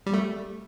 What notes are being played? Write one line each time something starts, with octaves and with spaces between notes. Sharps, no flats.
G3
A3